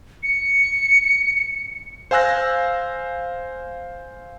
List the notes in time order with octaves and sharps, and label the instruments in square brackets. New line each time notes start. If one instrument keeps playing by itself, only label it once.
[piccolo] C#7
[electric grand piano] C5 F5 G#5 E6 F#6 A#6